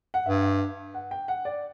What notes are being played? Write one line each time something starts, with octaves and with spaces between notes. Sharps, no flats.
F#5
G2 E5
F#5
G5
F#5
D5